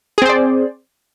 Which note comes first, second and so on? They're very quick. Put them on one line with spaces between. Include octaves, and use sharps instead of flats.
G#4 C4 C5 D5